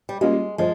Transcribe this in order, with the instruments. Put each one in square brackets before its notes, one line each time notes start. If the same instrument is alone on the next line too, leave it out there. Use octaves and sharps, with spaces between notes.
[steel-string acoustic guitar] G3
[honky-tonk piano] G3 A#3 C#4 F4 [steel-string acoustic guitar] G#3
[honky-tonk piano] F3 [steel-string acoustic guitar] G#3